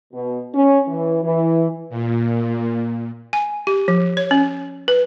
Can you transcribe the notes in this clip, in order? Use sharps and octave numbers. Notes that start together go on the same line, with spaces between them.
B2
C#4
E3
E3
A#2
G#5
G4
F3
C#5
C#4
B4